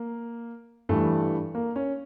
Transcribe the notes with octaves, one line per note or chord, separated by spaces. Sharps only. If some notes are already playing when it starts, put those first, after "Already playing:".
Already playing: A#3
G2 E3 G3 A3
A#3
C#4